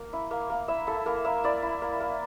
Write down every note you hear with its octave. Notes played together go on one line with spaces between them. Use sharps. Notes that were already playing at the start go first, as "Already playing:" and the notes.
Already playing: A#3
E4
A#3
A#3
E4 E5
E4 A4
A#3 A#4
A#3 E5
E4 D5
E4
A#3
A#3